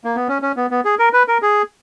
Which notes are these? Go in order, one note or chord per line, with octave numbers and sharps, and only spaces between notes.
A#3
B3
C#4
C#4
B3
B3
G#4
A#4
B4
A#4
G#4